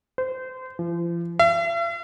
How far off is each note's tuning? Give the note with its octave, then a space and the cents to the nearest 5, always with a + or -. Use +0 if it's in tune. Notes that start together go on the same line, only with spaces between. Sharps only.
C5 -25
F3 -40
E5 +45